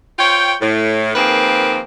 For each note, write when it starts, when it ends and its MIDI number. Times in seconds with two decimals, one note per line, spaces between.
0.19 0.53 65
0.19 0.53 72
0.19 0.53 73
0.19 0.53 79
0.61 1.13 45
1.15 1.79 51
1.15 1.79 53
1.15 1.79 58
1.15 1.79 60
1.15 1.79 68
1.15 1.79 71